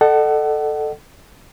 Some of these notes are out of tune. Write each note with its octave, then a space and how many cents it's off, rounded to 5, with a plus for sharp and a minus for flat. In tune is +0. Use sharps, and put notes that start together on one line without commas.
A4 +0 D#5 -45 F#5 +25